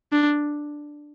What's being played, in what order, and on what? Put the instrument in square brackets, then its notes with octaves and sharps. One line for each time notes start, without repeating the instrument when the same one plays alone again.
[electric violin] D4